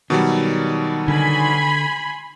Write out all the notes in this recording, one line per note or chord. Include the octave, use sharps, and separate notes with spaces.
B2 D#3 F#3 G3
D3 G#5 B5 C6